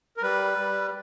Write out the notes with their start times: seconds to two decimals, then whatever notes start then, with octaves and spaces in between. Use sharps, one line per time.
0.17 A#4
0.22 G3 B4
0.58 G3